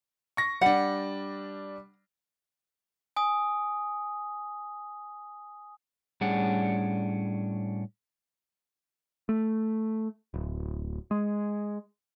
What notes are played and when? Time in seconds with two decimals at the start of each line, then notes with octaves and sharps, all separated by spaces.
0.37 C#6 A#6
0.61 G3 D4 F#5
3.16 G#5 D#6
6.21 A2 G3 C#4 D4 G#4 F#5
9.29 A3
10.34 D1
11.11 G#3